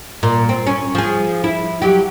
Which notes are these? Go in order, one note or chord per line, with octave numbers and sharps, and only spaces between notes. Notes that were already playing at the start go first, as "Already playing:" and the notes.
A#2
C4
C#4
F3 G#4
E4
F#3 G4